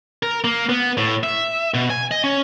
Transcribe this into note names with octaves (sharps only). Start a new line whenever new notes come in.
A#4
A#3
B3
A2
E5
B2
G#5
D#5
C#4